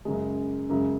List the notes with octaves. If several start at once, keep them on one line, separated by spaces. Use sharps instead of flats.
F#2 C#3 G#3
F#2 C#3 G#3